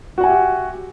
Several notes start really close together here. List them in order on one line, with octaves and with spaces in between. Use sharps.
F#4 F#5 G#5 E5 G4